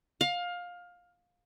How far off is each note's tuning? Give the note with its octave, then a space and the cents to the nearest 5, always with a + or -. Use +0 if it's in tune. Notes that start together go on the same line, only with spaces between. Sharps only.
F5 +20